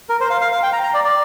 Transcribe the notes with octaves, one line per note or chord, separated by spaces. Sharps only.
A#4
C5
F5
F5
F5
G5
A#5
A#5
D5
D5